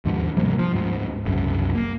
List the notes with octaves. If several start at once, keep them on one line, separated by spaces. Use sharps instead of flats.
D#2 G#2 D3 F3
C3 F3 G3 A#3
F3
D2 G#2
F#1 C2 F#2
A#3